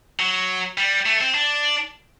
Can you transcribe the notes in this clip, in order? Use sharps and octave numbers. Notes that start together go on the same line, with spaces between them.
F#3
G3
A3
C4
D4